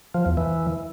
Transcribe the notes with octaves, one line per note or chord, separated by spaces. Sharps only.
F3
E2
E3